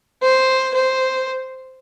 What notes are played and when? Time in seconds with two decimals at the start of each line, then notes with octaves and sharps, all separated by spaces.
0.23 C5
0.74 C5